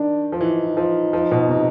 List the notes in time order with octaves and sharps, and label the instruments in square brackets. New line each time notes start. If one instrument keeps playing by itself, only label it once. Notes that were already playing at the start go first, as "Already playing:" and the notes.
Already playing: [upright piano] D#3 [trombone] D4
[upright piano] F3
[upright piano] E3 [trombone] D#4
[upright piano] F3
F3
B2
C3